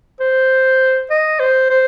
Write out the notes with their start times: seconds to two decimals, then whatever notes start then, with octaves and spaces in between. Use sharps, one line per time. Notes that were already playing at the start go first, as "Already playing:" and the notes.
0.20 C5
1.10 D#5
1.40 C5
1.70 C5